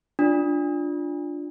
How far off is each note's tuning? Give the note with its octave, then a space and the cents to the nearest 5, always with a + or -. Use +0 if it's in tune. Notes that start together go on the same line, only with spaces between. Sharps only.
D4 +0 F4 +0